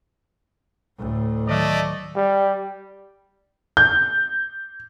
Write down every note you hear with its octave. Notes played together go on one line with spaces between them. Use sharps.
D2 A2
D#3 F#3 A3 D5 D#5
G3
G6